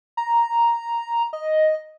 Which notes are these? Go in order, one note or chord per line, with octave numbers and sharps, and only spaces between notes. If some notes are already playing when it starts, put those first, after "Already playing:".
A#5
D#5